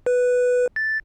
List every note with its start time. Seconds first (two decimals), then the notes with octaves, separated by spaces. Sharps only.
0.06 B4
0.76 A6